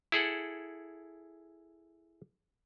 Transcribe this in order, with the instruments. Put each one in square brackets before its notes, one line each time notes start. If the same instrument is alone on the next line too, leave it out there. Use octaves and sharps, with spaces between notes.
[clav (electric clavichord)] E4 G#4 A4 F#5